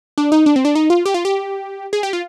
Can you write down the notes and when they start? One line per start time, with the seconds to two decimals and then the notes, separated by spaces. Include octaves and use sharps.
0.18 D4
0.32 D#4
0.46 D4
0.56 C4
0.65 D4
0.75 D#4
0.90 F4
1.06 G4
1.14 F4
1.25 G4
1.93 G#4
2.03 G4
2.13 F4